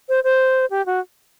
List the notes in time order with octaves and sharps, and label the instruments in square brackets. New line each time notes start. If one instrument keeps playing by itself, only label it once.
[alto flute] C5
C5
G4
F#4